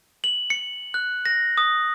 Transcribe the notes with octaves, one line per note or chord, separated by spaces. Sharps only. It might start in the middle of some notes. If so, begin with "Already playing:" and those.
F#7
C#7
F#6
A#6
D#6